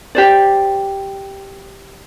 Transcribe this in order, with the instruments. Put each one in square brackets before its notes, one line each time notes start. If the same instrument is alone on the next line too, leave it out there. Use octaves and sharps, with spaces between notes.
[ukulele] G4 C5 D5